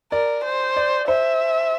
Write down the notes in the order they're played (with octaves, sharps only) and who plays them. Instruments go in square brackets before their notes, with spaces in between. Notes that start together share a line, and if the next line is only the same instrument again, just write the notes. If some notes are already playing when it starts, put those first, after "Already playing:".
[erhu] A#4 [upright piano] D5
[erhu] C5
[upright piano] D5
[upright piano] C5 [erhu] E5